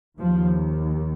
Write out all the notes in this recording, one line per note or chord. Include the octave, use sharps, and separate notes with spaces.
D#2 F3